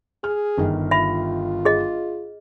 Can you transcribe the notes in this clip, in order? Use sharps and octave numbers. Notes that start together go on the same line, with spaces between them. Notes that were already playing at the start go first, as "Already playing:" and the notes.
G#4 F6
G1 D#3
F4 E5 B5
G#4 D#5